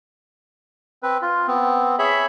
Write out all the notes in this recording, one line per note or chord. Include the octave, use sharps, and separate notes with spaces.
C4 B4
F4
B3 C4
G#4 C#5 E5 B5